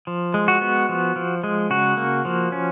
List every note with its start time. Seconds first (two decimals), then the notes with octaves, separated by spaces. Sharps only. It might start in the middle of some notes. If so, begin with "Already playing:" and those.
0.07 F3
0.34 G#3
0.48 F#4
0.61 B3
0.89 F3
1.16 F3
1.44 G#3
1.70 C#3 F#4
1.97 A#3
2.25 F3
2.52 C#4